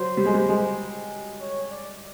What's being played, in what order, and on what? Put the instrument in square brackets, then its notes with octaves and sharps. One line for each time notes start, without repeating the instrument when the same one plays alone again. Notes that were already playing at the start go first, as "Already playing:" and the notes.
Already playing: [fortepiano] F#3 [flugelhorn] C5
[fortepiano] G3
G#3
G3
G#3
[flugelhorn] C#5
D5